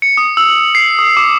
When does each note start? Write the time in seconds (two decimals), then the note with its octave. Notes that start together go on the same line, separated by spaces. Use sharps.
0.02 C#7
0.17 D#6
0.37 E6
0.75 C7
0.99 D#6
1.17 D6